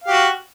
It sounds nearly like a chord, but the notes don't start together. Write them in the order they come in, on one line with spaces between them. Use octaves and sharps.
F5 G4 F#4